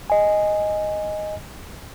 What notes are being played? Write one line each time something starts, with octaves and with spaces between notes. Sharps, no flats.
D#5 G#5